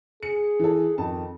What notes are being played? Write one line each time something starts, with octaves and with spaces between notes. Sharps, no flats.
G#4 C#7
E3 A4
F2 D#3 A5